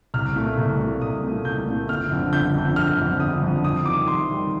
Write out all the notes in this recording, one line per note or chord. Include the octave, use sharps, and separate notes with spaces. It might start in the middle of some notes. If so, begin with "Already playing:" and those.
C2 F6
A#2 A3
C2
A#2 A3
C2 D#6
A#2 A3
C2 G6
A#2 A3
G1 F6
F2 D3
G1 G6
F2 D3
G1 F6
F2 D3
G1 D#6
F2 D3
F2 D#6
D#3 G3 D6
F2 C6
D#3 G3